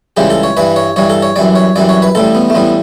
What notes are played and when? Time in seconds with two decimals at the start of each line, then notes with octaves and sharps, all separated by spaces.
0.17 C#2 C#3 E3 G3 G4
0.30 A4
0.43 C#5
0.57 G2 E3 G3 B4
0.76 C#5
0.96 G2 E3 G3 C#5
1.10 A4
1.22 C#5
1.36 F#2 E3 G3 D5
1.55 C#5
1.76 F#2 E3 G3 D5
1.89 C#5
2.02 B4
2.15 A1 A2 G3 A4
2.35 B3
2.50 A3
2.55 A1 A2 G3 B3